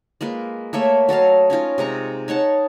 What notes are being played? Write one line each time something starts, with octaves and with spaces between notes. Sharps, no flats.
G#3 A#3 F4 B4
A3 A#3 C#5 E5
F#3 A4 D#5 F5
C#4 D#4 F4 A#4
C3 G#3 A#5 C#6
D#4 C#5 F#5 A5